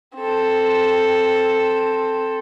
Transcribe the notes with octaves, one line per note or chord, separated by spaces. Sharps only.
C4 A4